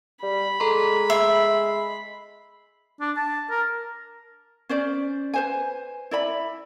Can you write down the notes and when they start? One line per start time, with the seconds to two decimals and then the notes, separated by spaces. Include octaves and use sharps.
0.23 G3 B5
0.60 G#3 A4 A#5 C6
1.10 E5 C7
3.01 D4
3.16 A5
3.51 A#4
4.69 C#4 C5 D5
5.34 B4 C5 G#5
6.11 E4 D5 B5